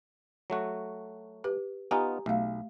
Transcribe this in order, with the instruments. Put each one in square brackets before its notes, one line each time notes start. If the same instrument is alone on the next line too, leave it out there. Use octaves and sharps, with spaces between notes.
[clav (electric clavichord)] F#3 A3 F#4
[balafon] G4 B4
[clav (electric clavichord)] B3 D#4 F4 [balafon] G4 G#5 A#5
[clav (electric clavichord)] B1 [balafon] A3 F5